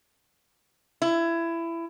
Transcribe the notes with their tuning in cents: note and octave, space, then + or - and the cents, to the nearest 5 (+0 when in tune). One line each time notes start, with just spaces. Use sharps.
E4 +20